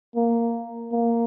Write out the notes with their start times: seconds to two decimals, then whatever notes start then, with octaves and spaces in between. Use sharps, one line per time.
0.16 A#3
0.92 A#3